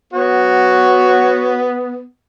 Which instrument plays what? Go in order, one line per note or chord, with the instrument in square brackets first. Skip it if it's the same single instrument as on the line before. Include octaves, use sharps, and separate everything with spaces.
[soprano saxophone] B3 [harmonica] F#4 C#5